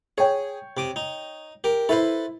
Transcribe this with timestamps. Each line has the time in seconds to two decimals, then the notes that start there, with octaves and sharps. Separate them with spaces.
0.18 G#4 C#5 G5
0.77 C3 D6 D#6
0.96 D#4
1.64 G4 A#4
1.89 E4 A4 B4 C5